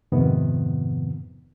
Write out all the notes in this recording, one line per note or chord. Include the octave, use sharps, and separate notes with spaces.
F2 G#2 C3 D#3 F3 B3